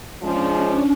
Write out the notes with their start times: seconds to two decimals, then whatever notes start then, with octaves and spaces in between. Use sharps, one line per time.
0.21 F3 G#3 C#4 D4